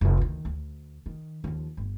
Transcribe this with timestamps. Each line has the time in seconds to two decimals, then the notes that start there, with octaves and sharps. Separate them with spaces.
0.01 F1 F2
0.17 D2 D#3
0.45 D2
1.06 D#3
1.44 D#2 F3
1.77 G1